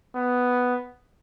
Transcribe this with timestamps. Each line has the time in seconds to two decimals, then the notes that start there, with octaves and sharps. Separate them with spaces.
0.16 B3